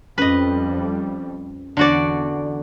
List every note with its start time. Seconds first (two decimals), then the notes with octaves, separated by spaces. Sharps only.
0.18 F2 G3 C#4 B4 D#5
1.77 E2 D3 F#4 D5